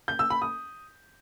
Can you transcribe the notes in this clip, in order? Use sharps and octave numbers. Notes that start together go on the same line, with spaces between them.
G6
E6
B5
D#6